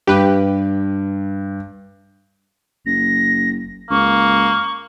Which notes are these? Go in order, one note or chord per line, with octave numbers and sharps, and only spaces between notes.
G2 G4 B4
F#1 A#6
C#2 A#3 C#6